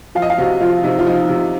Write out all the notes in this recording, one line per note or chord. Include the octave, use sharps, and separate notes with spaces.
F3 F5
D#5
F5
C3 F#4
F3 F4
C3 D#4
F4
F3 D#4
C3